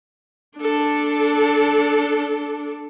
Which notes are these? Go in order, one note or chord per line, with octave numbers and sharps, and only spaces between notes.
D4 A4